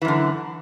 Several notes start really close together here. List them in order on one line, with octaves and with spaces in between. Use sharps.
E3 F#2 D3